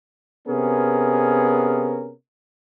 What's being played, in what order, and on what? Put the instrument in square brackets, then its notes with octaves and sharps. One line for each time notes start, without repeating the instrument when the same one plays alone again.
[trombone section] C3 B3 C#4 G#4 A#4